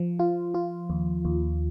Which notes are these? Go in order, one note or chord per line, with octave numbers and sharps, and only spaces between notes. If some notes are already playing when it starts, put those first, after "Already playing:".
Already playing: F3
F4
F4
D#2
D#2